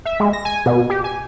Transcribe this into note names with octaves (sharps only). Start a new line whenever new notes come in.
E5
G#3
A#6
G#5
B2
G4
G#5